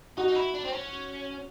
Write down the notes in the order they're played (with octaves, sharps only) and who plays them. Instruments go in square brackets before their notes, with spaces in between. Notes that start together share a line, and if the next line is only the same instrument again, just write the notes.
[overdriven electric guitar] D#4 [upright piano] F#4
[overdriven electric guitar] D#4
E4
D4
C4
C#4